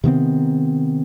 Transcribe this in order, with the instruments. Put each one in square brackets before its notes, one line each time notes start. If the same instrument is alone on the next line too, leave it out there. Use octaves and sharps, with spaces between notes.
[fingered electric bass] C3 D#3 B3 C4